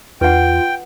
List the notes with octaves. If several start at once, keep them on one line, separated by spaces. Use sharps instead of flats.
E2 F4 B4 F#5 G5